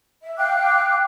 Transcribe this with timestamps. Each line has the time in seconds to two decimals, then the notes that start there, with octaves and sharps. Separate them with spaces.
0.21 E5
0.38 F5 G5 D6 F#6